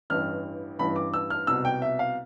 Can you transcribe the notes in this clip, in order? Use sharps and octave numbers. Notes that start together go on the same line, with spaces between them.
A1 G2 E3 F6
A1 G2 E3 B5
D6
E6
F6
C2 B2 E6
G5
E5
F5